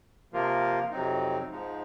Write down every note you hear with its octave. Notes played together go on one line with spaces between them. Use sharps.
C3 F3 A#3 F4 A#4
F2 C3 F#3 C4 D#4
G#2 F3 G#3 D#4